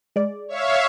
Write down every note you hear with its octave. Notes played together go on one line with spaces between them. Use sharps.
G#3 D5
C#5 E5 F5